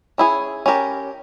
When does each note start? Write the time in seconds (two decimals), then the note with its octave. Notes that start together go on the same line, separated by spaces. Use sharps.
0.18 C#4 E4 G#4 C#5
0.66 C#4 G4 A#4